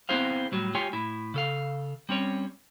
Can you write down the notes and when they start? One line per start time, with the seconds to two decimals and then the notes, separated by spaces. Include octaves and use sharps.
0.09 B3 C4 E4 G#4 C5 F5
0.52 A2 F#3 G3
0.75 G#3 F4 G4 C#5 G5 G#5
0.93 A2 E4
1.34 C#3 A4 F5
2.09 G3 C4 C#4 C#5